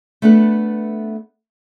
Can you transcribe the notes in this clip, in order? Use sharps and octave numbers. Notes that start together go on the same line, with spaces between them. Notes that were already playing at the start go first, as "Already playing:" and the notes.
A3 B3 D4 A4 B4